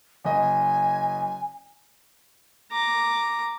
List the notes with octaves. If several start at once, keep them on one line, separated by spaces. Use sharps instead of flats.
F#1 D#5 G#5
A#5 D6